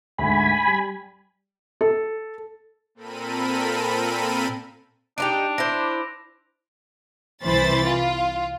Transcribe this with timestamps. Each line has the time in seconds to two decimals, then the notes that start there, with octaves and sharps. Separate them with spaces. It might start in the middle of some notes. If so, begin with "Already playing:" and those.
0.18 D2 G#2 G#5 B5
0.67 G3
1.81 A4
2.95 A#2 C4 A4 A#4 B5 D#7
5.18 D4 D#4 F4 G4 D7 F7
5.58 E4 C5 A#6
7.43 C2 E3 C5 B5 A6
7.86 F4